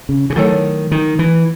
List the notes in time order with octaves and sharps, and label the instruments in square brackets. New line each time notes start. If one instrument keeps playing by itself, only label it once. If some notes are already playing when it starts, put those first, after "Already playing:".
[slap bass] C#3
C#3
[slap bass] D#3 [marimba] F#3 A3 E4 A4 C#5
[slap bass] D#3
E3